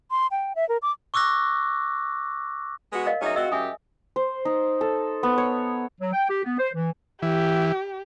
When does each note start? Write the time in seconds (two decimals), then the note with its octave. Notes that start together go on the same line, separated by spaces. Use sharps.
0.11 C6
0.31 G5
0.56 E5
0.69 A#4
0.82 D6
1.14 C#6 D6 E6 F#6 A#6
2.93 G#3 B3 F#4
3.06 A#4 D#5 F5
3.22 F#3 C#4 D#4 G#4 D#5 E5
3.36 C4 F4 F#4 D#5 E6
3.52 F#2 G4 E5 G#5 D#6
4.16 C5
4.45 D#4
4.81 A4
5.23 B3
5.38 C#5
6.00 F#3
6.13 G5
6.29 G4
6.44 B3
6.58 C5
6.74 E3
7.22 E3 G4